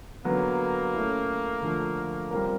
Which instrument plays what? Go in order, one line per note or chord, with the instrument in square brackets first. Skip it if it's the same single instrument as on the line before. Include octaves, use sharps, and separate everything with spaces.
[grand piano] D3 F#3 B3 [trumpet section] A#3
[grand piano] A3 C#4 E4
D3 F3 A3
G3 C4 F4 A#4